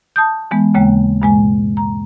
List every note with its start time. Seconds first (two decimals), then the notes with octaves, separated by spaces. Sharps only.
0.16 A5 D#6 G6
0.51 E3 G#3 B3
0.74 D#2 C#3 G#3 A#3 G5
1.22 G2 B2 G#3 G#5
1.77 A#5